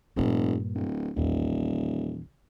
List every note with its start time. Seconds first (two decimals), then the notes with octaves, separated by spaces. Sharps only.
0.16 F1 G2 A#2
0.75 D1
1.16 D#1 A#1 E2